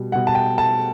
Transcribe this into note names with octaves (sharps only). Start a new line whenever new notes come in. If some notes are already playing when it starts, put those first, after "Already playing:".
Already playing: B2 G3
B2 G3 F#5
A5
G5
A5